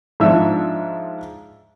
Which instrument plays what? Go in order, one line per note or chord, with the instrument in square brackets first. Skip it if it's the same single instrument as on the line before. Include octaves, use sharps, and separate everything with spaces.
[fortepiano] G#2 F3 D4 E5 E6